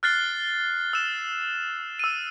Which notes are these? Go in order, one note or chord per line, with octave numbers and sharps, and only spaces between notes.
F6 F#6 A6 C7 G7
E6 E7
E6 D#7